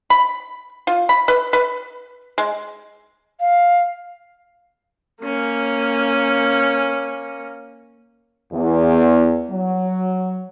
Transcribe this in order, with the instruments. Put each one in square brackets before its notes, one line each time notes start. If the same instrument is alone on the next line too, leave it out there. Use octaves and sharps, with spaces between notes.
[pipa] B5
F4
B5
B4
B4
G#3
[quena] F5
[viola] A#3 C#4
[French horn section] E2
F#3